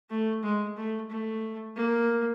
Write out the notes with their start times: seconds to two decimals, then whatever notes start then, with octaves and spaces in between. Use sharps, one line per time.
0.10 A3
0.43 G#3
0.77 A3
1.10 A3
1.76 A#3